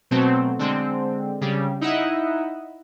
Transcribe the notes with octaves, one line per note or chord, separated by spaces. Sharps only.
B2 F#3 A3 C4
D3 G#3 C4
C#3 G3
D#4 E4 D#5 E5 F#5